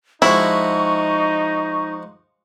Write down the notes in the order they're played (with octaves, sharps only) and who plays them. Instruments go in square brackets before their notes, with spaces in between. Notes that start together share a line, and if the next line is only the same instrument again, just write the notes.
[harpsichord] F3 G#3 F#4 [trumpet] D#4 [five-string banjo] E4 [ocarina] C#6